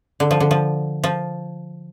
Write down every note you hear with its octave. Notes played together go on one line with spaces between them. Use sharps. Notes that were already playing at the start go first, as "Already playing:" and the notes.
D3
F3
D3
F3
F3